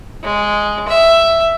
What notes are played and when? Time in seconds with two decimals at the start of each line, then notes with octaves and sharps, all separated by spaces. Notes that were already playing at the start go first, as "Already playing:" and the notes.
0.23 G#3
0.88 E5